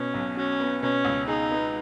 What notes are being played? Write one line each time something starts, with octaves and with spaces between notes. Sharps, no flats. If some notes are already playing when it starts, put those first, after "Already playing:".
Already playing: B2 C#4
B1
C#4 F#4
B3
B2 C#4
C#2
D#4 G#4
B3